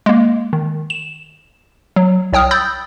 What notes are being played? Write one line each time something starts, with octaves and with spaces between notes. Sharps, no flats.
G#3 A#3
D#3
E7
F#3
C2 C#5 G5 D#6 F6
B5 D#6 E6 G6 A6